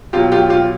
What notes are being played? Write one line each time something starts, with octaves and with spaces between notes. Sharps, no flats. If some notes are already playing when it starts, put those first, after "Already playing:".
B2 F#3 F4 G4
F4 G4
F4 G4